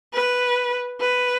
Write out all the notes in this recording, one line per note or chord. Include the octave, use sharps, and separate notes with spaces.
B4
B4